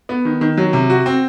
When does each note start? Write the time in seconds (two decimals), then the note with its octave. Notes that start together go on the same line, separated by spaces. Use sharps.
0.09 B3
0.25 D#3
0.41 D#3
0.57 F#3
0.73 C3
0.90 F#4
1.06 C4